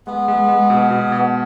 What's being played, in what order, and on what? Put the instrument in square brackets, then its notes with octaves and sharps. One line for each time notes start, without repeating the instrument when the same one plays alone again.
[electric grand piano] G#3 [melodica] B3
[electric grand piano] G#3
G#3
B2
B2
B2